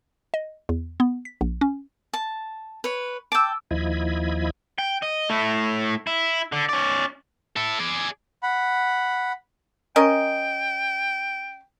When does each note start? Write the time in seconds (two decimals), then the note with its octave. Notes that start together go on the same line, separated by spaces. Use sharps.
0.34 D#5
0.69 E2
1.00 B3
1.25 B6
1.41 A#1
1.61 C#4
2.14 A5
2.84 B4 C#5
3.32 G5 A5 D6 E6
3.71 D#2 F3 E4 D#5 B5 G#6
4.78 G5
5.02 D#5
5.29 A3 E4
6.07 E4
6.52 D3
6.69 C#4 D5
7.56 E4 A4
7.80 G#4 D5
8.43 F#5 B5
9.96 C#4 A#4 D#5 G5